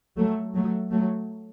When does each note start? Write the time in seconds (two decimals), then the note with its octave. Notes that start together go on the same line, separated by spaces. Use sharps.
0.18 F#3 A3
0.55 F#3 A3
0.91 F#3 A3